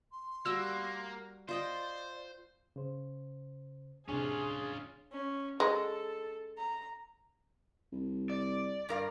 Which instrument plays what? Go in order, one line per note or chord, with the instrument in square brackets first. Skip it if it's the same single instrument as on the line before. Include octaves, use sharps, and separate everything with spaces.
[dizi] C6
[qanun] G3 F#4 [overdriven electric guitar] A#3 [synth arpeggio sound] E6
[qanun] F4 D#5 G5 [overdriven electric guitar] C5 [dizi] D5
[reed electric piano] C#3 C5
[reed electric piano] F2 A2 C3 [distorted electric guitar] C#4 F4 [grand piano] D4 G#5 [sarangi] G#4
[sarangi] C#4
[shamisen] G#3 [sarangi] A4
[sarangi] A#5
[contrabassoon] C2
[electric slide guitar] D5
[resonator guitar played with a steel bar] G2 A#4 F5